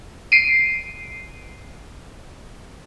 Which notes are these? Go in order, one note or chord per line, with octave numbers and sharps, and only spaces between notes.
C7 D7 D#7